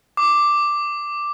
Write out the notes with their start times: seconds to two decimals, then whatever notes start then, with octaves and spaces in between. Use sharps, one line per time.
0.17 D6